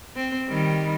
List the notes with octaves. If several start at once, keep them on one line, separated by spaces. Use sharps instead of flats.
C4
D#3 G3